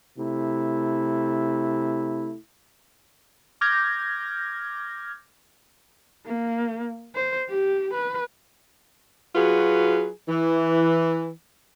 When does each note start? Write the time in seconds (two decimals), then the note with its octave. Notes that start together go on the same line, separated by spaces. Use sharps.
0.18 C3 A3 E4
3.61 D6 F6 G6 G#6 A#6
6.27 A#3
7.15 C5
7.50 G4
7.94 B4
9.35 F#3 F4 F#4 G#4 B4
10.29 E3